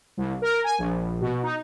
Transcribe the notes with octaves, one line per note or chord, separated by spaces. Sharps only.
C2
A#4
G#5
A#1
B2
D#4